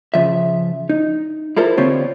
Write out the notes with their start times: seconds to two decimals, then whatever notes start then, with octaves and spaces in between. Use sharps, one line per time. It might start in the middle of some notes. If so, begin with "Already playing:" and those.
0.14 C#3 F3 E5
0.89 D#4
1.57 E4 F4 A4 A#4 C5
1.77 D3 B3 C4 F4 G4 C#5